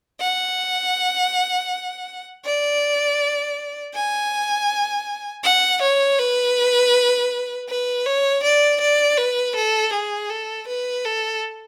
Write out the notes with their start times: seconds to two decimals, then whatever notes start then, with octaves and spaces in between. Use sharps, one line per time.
0.20 F#5
2.45 D5
3.95 G#5
5.44 F#5
5.82 C#5
6.19 B4
7.69 B4
8.06 C#5
8.43 D5
8.81 D5
9.18 B4
9.56 A4
9.93 G#4
10.30 A4
10.68 B4
11.05 A4